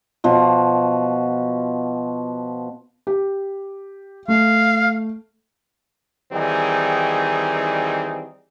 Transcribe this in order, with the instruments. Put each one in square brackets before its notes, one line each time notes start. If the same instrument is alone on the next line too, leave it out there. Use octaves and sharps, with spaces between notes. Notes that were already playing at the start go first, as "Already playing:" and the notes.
[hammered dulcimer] B2 F3 F#4
[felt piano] G4
[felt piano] A3 [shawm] F5
[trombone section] D#3 E3 G3 C4 D#4 G#4